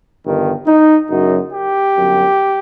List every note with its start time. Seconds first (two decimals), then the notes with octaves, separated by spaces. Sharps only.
0.23 G1 G2 D#3
0.66 D#4
1.09 F#1 F#2 F#3 D#4
1.52 G4
1.95 G1 F#2 F#3